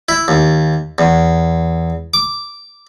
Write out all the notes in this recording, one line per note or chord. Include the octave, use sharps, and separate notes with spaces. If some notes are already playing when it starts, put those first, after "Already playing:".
E4
D#2
E2
D6